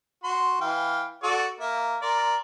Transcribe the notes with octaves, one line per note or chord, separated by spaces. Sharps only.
F#4 C6
E3 F5 G5
F#4 A4 D5
A#3 E5
A#4 D5 C6